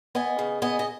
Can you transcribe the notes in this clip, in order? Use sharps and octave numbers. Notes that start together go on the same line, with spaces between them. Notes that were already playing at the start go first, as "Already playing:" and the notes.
B3 D#5 G#5
C#3
B3 D#5 G#5
D#5